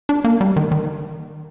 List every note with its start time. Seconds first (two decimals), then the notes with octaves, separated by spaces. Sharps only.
0.09 D4
0.24 A#3
0.41 G3
0.56 D#3
0.72 D#3